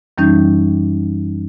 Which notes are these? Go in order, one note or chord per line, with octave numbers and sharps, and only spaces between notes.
F#2 E3 G3 C#4 D#4 G6